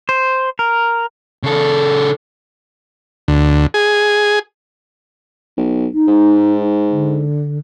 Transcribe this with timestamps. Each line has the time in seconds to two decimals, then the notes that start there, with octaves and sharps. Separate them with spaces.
0.09 C5
0.59 A#4
1.43 C#3 A4
3.28 D2
3.74 G#4
5.57 B1
5.93 D#4
6.07 G#2
6.90 D3